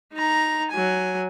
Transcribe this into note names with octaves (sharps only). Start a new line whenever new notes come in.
D#4 A#5
F#3 G#5